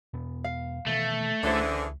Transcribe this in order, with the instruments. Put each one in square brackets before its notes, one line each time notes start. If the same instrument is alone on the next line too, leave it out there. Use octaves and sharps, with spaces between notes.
[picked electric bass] E2 B2 B3
[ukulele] F5
[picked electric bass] B2 D#3 E3 [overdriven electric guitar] A3
[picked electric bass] C#2 [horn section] D3 E3 G#4 [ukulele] C#4 E4 C5